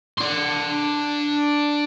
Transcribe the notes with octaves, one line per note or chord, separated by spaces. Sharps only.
D4 C6